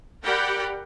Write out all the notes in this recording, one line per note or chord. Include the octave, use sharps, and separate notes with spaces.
G4 A#4 D5 F#5 G5 B5